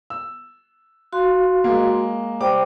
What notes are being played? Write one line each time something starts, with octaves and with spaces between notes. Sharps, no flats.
E6
F#4 F5 C6
G#3 A#3
G3 C5 G5 D6